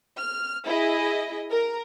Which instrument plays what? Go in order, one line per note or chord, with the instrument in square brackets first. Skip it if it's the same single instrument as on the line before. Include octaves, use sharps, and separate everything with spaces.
[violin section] F6
E4 G#4 D#5
A#4